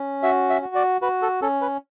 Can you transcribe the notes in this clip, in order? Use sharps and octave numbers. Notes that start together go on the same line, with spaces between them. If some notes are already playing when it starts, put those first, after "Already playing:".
Already playing: C#4
F#4 E5
E5
F#4
D5
F#4 B4
A4
C#4 A4
B4